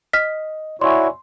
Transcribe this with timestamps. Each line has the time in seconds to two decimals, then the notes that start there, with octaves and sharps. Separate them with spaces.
0.13 D#5 F6 B6
0.81 E4 F#4 C#5 D5 E5 G#5 C6